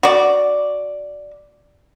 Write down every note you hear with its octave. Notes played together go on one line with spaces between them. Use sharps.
F#4 D5